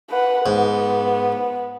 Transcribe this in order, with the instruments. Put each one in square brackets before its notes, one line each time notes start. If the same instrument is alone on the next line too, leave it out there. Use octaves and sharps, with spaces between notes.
[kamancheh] B4 F#5
[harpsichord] G#2 [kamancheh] B3